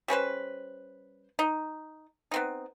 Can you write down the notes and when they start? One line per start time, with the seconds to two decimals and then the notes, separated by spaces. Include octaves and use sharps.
0.08 G3 C#4 B4 C5
1.39 D#4
2.31 B3 C4 D#4